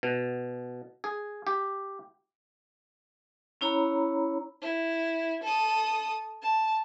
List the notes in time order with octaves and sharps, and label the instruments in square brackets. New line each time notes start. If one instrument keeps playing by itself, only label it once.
[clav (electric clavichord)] B2
G#4
G4
[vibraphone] C#4 E4 C#5 A#5 B5
[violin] E4
A4 D#6
A5